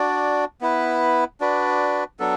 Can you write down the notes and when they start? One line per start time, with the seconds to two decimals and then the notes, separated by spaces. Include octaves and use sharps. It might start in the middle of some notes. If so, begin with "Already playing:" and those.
Already playing: D4 F#4 D5
0.61 B3 E4 B4
1.40 D4 F#4 B4 D5
2.19 F#3 B3 D4 A4